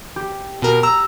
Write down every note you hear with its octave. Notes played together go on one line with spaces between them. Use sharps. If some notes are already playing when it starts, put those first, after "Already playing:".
G4
B2 A#4
A#5 E6